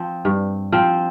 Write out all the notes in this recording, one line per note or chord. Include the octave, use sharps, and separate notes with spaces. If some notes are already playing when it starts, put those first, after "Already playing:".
Already playing: F3 C4
G2
F3 C4